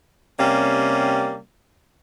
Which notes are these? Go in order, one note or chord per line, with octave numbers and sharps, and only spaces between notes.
C3 G3 A#3 C#4